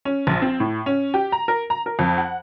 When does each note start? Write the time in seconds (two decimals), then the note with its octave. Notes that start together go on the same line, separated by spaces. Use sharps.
0.05 C#4
0.27 A#1
0.42 C4
0.60 A2
0.86 C#4
1.14 G4
1.32 A#5
1.48 A#4
1.70 A#5
1.86 A#4
1.99 F2
2.18 F#5